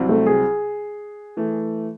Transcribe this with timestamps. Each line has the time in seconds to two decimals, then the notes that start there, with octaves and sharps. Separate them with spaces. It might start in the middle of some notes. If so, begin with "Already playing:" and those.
Already playing: C2 C3 F#3 C4
0.09 A3
0.27 G#4
1.37 E3 A3